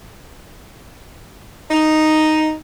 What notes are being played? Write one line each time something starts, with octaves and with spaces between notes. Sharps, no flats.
D#4